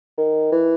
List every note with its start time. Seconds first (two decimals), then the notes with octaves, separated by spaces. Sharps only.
0.18 D#3
0.52 E3